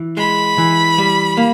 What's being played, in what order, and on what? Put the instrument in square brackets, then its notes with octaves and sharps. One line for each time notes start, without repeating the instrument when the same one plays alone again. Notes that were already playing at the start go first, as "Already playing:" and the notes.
Already playing: [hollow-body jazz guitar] E3
[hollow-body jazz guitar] G#3 [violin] B5
[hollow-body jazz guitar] E3
G3
A#3